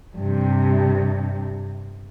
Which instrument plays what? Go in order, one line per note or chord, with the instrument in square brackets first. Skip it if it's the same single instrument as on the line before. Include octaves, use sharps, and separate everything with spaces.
[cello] G2 C3